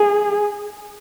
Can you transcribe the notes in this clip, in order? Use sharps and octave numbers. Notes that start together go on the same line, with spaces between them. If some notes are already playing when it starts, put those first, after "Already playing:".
Already playing: G#4